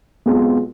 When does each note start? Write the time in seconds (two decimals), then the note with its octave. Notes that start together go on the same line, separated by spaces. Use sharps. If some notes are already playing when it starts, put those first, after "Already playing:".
0.26 B1 B2 G#3 C4 F4